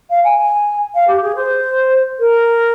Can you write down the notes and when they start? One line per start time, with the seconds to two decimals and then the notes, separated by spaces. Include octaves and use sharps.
0.10 F5
0.24 G#5
0.38 G#5
0.94 F5
1.08 G4
1.22 G#4
1.36 C5
2.20 A#4